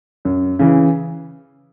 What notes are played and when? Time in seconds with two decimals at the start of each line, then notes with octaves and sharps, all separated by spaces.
0.25 F#2
0.59 C#3 E3